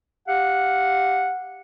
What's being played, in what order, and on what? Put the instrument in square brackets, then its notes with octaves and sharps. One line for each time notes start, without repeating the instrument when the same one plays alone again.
[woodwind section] G4 F5 F#5